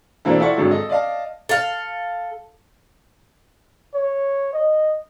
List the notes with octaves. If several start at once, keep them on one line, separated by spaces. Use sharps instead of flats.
B2 E3 A#3 C4 D4 A4
E4 F4 A4 D5 F#5 C#6
G#1 D3 F#3 G#3 A4
A4 D#5
D5 D#5 F5 A5
A4 F5
C#5
D#5